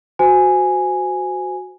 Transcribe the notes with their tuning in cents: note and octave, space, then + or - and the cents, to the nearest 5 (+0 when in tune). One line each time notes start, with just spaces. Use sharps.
F#4 -5 C5 -30 G#5 +0